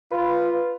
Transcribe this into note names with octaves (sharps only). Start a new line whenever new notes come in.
F4 B4